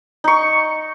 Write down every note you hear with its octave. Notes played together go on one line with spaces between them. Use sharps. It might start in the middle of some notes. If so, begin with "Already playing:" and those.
D#4 C#6